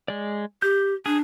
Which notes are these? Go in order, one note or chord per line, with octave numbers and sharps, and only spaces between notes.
G#3 D5
G4 G6
D4 G#4